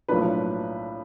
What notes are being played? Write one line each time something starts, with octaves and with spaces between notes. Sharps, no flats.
B1 A2 F3 A#3 D4 B4